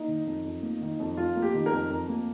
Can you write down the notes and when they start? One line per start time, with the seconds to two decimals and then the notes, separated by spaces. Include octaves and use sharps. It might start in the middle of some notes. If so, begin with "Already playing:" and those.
Already playing: A#3 D#4
0.08 D#3
0.26 F2
0.44 F2
0.62 A#3
0.81 D#3
1.00 F2
1.17 F2 F4
1.36 A#3
1.42 G4
1.54 D#3
1.66 A#4
1.72 F2
1.90 F2
2.09 A#3